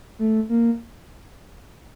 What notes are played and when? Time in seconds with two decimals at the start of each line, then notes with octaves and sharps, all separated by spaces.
0.19 A3
0.49 A#3